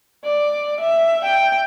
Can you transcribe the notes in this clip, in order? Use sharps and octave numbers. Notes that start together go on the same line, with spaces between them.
D5
E5
G5